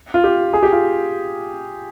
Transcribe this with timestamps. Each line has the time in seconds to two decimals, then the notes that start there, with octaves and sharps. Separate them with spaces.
0.14 F4
0.24 G4
0.53 G#4
0.63 G4
0.72 F4